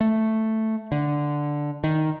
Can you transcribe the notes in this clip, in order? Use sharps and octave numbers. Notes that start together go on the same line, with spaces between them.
A3
D3
D#3